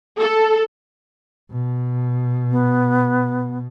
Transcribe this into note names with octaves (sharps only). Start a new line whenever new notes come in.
A4
B2
B3